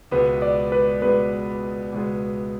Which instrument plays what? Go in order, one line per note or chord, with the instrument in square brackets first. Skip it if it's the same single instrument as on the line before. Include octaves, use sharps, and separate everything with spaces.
[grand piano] C#2 B2 G#3 B3 [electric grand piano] B4
[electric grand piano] D5
B4
[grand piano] C#2 B2 G#3 B3 [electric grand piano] B4
[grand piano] C#2 B2 G#3 B3